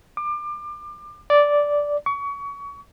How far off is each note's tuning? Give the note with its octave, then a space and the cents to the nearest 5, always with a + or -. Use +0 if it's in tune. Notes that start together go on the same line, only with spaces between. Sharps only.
D6 +30
D5 -5
C#6 +30